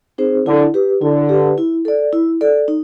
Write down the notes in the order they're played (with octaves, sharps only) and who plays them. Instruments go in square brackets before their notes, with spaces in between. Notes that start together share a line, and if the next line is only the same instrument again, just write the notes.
[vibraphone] C4 D#4 G#4 C5
[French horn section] D3 [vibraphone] E4
[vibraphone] G4 B4
[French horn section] D3 [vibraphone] E4
[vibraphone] G4 B4
E4
A4 D5
E4
A4 D5
D#4